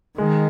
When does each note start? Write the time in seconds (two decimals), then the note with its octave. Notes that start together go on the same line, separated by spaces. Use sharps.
0.18 D#3 G#3